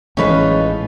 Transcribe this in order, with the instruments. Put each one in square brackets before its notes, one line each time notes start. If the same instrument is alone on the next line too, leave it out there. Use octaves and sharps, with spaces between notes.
[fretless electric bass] A1 E3 G#3 [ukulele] C#4 B4 [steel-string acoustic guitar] D#4 F4 A4